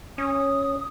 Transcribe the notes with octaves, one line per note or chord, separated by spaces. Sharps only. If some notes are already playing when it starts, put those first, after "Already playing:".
C#4 D#6